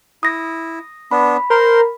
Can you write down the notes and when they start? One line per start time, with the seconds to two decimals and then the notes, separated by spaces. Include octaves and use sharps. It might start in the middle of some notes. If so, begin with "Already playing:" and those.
0.23 E4 D#6 A#6
1.11 B3 D4 B5
1.50 A#4 C5 C6